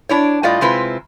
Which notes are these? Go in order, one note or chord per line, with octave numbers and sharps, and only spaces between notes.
D4 E4 C#5
A2 G3 F4 D5 D#5
C3 G#3 C4 E4 F4 B4